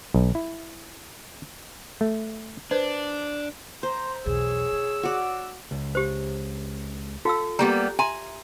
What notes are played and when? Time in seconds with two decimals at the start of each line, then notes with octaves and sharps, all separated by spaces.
0.14 B1
0.35 E4
2.01 A3
2.71 D4 B4 C5
3.83 C5 A#5 C6
4.26 B1 E2 G#4 C#5 E6
4.73 D#4
5.03 F#4 D5
5.71 C#2
5.95 G4 C5
7.25 F4 A4 F5 E6
7.59 G3 A#3 B3 G4 A#5
7.99 E5 G#5 A#5 C6